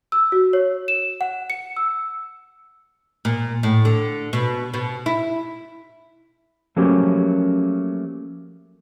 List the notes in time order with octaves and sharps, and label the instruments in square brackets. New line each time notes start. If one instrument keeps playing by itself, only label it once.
[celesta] E6
F#4
C#5
E7
F#5
C#7
E6
[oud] A#2
A2
D3
B2
B2
E4
[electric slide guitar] F3 F#3 A3 A#3 C#4 G4